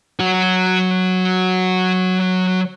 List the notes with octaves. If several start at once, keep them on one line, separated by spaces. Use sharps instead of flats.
F#3 F#4